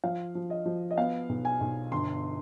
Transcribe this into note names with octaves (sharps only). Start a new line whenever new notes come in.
F3 F5
F3
D#5
F3
D#5
B3 F5
B1
G#5
B1
G1 C6